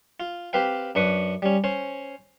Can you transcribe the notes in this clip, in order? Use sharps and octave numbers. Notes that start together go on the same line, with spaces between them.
F4
C4 G4 B4 F5 G5
F#2 D4 B4 C#6 D#6
G3 C#4
C#4 C5